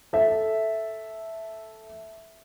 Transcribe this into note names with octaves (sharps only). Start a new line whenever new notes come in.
A4 E5